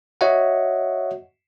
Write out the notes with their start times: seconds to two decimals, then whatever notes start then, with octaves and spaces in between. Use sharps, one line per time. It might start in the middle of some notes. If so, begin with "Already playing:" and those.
0.21 F#4 C#5 D#5 E5 F#5